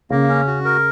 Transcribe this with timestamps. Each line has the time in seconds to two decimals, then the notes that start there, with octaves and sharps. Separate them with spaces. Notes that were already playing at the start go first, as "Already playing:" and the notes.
0.10 C#3 A#3
0.28 C#4
0.47 F#4
0.65 A#4